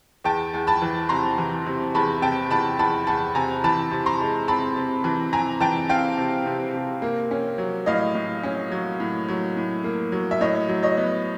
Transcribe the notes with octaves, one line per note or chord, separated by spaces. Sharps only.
E2 G5 A5
E2
A5 B5
E3
C3 A#5 C6
E3
C3
E2 A5 B5
C3 G5 A5
E2 A5 B5
E2 A5 B5
E2 A5 B5
C3 G#5 A#5
E3 A5 B5
C3
A#5 C6
G#3
C4 A5 B5
C3
E3
C4 G#5 A#5
E3 G5 A5
C4 F5 G5
C3
C3
C3
A#3
C#4
F#3
A2 D#5 F5
A2
C#4
F#3
A2
F#3
A2
A#3
F#3
E5
A2 C#5 D#5
F#3
C#5 D#5
B3